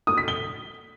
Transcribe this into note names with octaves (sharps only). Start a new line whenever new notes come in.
D#6
B6
G7